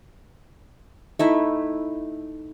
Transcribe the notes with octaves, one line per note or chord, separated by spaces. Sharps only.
A3 D#4 E4